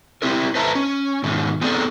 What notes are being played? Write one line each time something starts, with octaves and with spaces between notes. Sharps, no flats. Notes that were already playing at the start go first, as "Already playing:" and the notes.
C4 E4 G4 A#4
B4 C5 D#5 E5 A5 A#5
C#4
G#2 B2 D#3
B3 C4 D#4 G#4 A4 D5